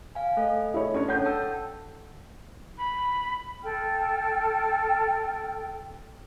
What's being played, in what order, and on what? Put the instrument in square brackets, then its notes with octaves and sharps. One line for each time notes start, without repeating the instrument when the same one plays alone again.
[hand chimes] F5 G#5
A3 A4 D#5
[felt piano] E4 C#5
C#4 D4 C#5
[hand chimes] A4 F#5 G5 [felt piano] C#5 G6
[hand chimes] G5 A5 E6
[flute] B5
[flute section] A4 G5 F6